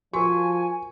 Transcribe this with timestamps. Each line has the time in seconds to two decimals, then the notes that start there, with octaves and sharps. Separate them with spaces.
0.13 F3 F#4 A#4 G#5 C#6